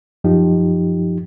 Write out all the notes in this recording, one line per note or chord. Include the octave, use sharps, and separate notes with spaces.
F#2 F3 D#4 G4